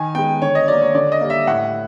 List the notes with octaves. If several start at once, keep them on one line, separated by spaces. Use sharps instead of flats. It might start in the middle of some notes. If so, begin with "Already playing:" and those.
Already playing: D#3 G#5
G#3 B3 G5
D3 C#5
D#5
F#3 A#3 D5
C#5
D3 D5
D#5
G3 A#3
E5
A2 F#5